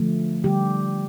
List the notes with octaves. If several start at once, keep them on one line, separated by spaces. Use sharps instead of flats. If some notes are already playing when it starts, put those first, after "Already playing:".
Already playing: D3 F3 A3
D3 G3 G4